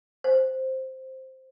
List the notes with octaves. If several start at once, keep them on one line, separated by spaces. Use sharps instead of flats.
C5